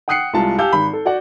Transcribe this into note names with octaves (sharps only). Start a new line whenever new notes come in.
F#5 G5 D#6 F#6 C7 C#7
C2 G#3 F4 A5
G4 F5 G#5 A5 E6 G6
G#1 B5
A4
F#4 D5 F#5